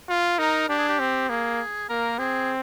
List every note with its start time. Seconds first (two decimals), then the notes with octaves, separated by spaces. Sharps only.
0.09 F4
0.39 D#4 A#4
0.69 D4 G4
0.79 G#4
0.89 G4
0.99 C4
1.29 A#3 G#4
1.89 A#3 A#4
2.19 C4 G#4